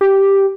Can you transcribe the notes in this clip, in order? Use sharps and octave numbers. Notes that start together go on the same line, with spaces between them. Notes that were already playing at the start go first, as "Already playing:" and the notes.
G4